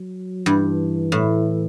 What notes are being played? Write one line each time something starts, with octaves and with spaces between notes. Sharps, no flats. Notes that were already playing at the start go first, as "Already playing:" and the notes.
Already playing: F#3
G2 E3
A2